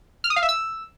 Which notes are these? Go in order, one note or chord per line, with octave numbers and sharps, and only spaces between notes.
F6
D#6
F5
E5
E6